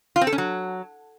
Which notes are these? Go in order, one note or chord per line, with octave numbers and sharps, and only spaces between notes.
F4
C4
A4
C#4
F#3